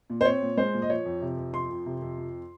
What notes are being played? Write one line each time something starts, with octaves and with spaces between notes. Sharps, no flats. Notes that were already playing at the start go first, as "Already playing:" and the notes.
A#2
C5
C4 C#5
A#2
G#3 C5
A#2
D#5
F3 C#5
F2
C3
F2
F3 C6
F2
C3
F2
F3